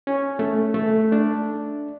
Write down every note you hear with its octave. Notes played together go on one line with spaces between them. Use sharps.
C#4
A3
A3
D4